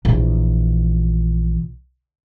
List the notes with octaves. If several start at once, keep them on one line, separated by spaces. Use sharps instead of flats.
A#1 E3